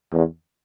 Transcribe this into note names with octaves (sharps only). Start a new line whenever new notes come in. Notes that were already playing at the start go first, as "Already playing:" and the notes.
E2